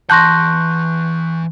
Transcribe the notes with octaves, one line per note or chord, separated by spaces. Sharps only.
E3 F#5 A5 C6 C#6 F#6 G6 A#6